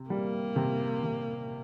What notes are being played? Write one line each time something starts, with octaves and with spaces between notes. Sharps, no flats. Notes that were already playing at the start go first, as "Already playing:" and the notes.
Already playing: C3
G3 A#3
C3
C3